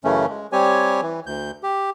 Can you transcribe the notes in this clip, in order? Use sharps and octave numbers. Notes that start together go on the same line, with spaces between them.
F#2 C#3 E3 A3 C#4
G#3
G3 C4 G4 C#5 G#5
E3
D2 G6
G4